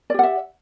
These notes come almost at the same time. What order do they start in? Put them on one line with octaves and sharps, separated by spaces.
D5 G4 F#5 E5